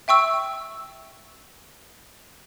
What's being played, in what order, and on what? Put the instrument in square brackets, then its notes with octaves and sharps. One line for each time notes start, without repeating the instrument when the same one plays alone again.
[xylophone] E5 G5 C#6 E6